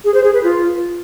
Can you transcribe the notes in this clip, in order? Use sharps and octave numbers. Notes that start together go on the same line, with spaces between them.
G#4
C5
G#4
B4
F4